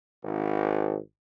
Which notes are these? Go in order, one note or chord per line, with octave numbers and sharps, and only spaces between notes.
G#1